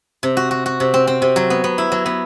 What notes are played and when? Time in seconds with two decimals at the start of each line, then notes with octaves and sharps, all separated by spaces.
0.23 C3
0.37 F#4
0.51 F#4
0.66 F#4
0.80 C3
0.94 C4
1.07 C4
1.22 C3
1.36 F#3
1.50 B3
1.64 B3
1.78 E4
1.92 F#3
2.06 B3